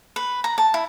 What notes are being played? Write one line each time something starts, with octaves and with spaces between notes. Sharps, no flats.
B4
A#5
A5
E4